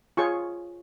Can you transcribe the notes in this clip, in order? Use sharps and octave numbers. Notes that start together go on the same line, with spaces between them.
F4 G#4 C#5 C#6